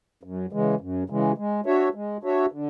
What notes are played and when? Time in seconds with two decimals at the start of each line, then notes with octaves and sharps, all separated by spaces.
0.23 F#2
0.52 C#3 E3 G#3
0.81 F#2
1.10 C#3 E3 G#3
1.38 G#3
1.66 D4 F#4 C#5 E5
1.95 G#3
2.23 D4 F#4 C#5 E5
2.52 D3